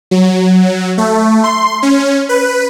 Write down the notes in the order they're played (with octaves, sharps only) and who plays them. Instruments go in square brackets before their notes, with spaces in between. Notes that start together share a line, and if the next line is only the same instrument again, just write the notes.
[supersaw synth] F#3
A3
C6
C#4
B4